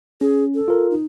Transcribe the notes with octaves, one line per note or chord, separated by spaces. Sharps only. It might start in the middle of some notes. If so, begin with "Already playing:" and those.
C#4 G#4
A4
F4 A#4
D#4